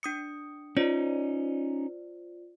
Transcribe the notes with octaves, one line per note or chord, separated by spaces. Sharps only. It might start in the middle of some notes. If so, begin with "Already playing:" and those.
D4 D#6 C#7
C#4 D#4 F4 C5 D5